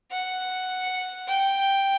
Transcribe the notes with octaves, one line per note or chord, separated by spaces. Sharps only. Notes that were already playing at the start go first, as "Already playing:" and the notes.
F#5
G5